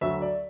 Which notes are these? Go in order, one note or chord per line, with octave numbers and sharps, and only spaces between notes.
D2 D3 F#3 E5
D5